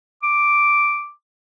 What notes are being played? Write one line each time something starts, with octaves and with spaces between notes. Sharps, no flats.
D6